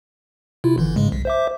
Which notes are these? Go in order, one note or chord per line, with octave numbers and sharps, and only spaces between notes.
C3 E4 F4
G1 D3 E3
G#2 C#3 G#3
B1
C5 E5 D6